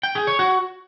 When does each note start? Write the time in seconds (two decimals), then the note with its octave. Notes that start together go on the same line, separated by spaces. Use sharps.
0.03 G5
0.15 G#4
0.27 C#5
0.39 F#4